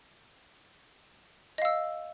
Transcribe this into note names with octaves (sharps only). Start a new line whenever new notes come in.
D#5 F5 E6